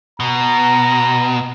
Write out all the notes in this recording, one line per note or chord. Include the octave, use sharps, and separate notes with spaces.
B2 A#5